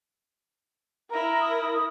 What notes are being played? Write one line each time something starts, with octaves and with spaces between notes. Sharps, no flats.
E4 A#4 A#5
D#6